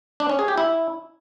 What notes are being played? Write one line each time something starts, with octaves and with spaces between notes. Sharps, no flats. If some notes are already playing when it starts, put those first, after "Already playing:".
D4
C#4
G#4
G4
E4